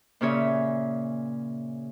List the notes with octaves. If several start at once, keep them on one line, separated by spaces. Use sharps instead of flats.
A#2 C#3 C#5 E5